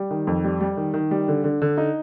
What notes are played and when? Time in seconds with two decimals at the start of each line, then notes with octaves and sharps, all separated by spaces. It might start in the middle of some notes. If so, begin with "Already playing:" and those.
Already playing: G3
0.11 D#3
0.27 F2
0.44 G3
0.61 G3
0.77 D#3
0.94 D#3
1.11 G3
1.28 D3
1.44 D3
1.62 D3
1.78 D#4